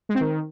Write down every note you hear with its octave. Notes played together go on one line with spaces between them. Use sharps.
G#3
C4
D#3